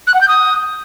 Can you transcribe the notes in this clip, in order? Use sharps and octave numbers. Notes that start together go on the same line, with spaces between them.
F#6
F#5
G6
D#6